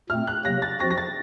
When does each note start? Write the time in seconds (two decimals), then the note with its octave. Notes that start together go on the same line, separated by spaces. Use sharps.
0.10 A#2 A3 C4 F6
0.27 F#6
0.45 C3 F#3 A#3 A#6
0.62 A6
0.80 F3 C4 F#4 A#6
0.91 A#6
0.98 A6